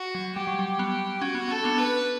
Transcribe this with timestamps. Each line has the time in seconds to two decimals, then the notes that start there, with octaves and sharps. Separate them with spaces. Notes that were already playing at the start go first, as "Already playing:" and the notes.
Already playing: F#4
0.15 F#3
0.36 G3 G4
0.47 F#3
0.59 G3
0.79 B3
1.22 C#4 F#4
1.35 B3
1.49 C#4 A4
1.64 B3 D4
1.78 B4